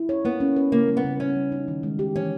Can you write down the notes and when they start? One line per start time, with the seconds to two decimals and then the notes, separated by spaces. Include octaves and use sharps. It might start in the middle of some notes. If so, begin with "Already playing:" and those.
Already playing: E4
0.09 C#5
0.25 A#3 B3
0.40 C#4
0.56 B4
0.72 C#3 A#3
0.88 G3
0.97 B3
1.04 C#3
1.20 C#3 C#4
1.36 G3
1.52 D#4
1.68 D#3
1.83 G#3
1.99 G4
2.16 E3 C#4